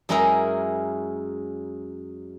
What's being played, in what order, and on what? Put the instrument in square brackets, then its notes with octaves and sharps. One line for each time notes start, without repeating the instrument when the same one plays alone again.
[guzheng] F#2 G#3 C#4 E4 G#4 A#4